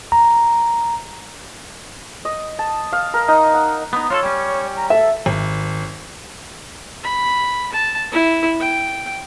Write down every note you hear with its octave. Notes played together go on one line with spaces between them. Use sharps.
A#5
D#5
A5
F5
A#4
D#4
F#5
B3 D#4
F4 F#4 A4 C#5
G3 C#4
A#5
A4 E5
G#1
B5
A5
E4
G5